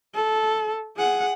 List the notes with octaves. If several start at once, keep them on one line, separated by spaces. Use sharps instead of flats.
A4
G#4 F#5